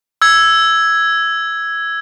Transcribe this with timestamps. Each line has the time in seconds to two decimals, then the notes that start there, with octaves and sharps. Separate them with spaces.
0.22 E6 G#6